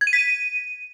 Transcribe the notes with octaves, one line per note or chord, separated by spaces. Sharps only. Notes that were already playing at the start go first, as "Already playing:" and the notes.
G#6
D#7
B6
D#7